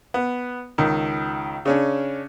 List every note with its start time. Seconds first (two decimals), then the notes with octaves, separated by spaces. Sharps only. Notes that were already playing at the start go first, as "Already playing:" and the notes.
0.14 B3
0.78 C#2 D#3
1.65 C#3 C#4 D4